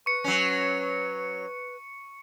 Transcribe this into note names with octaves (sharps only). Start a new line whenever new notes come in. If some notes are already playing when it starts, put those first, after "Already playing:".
B4 C#6 C#7
F#3 C#4